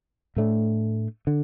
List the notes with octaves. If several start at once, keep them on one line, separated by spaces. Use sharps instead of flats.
A2 A3 D4
D3